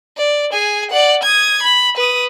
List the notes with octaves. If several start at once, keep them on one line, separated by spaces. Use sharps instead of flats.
D5
G#4 G#5
D5 F#5
D#6 G#6
B5
B4 D#6